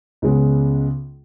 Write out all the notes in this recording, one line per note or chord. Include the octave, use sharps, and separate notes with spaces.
C#2 C#3 G#3 B3